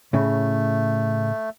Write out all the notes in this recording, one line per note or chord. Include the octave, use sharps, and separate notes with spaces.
A2 C#3 A3